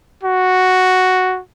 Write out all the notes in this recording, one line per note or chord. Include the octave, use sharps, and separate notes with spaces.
F#4